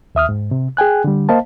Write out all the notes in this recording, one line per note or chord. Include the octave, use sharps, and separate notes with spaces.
D#2 E5 D#6 F6
G#2
C3
G#4 G5 G#5 F#6
D3 G3
A#3 C5 D#5 F5 A5